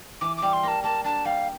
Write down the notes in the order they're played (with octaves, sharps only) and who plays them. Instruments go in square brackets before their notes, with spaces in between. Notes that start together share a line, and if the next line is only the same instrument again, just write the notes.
[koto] E3 [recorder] D6
[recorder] D6
[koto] G3
[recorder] C6
[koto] A#3 [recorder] A5
[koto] A#3 [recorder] A5
[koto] D4 [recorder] A5
[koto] G3 [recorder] F5